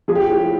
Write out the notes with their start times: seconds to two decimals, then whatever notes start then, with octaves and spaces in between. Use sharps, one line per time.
0.08 F3 G#4
0.15 G4
0.30 A2 G4